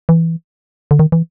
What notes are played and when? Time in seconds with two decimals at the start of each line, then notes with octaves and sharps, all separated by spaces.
0.09 E3
0.91 D3
0.99 D#3
1.12 E3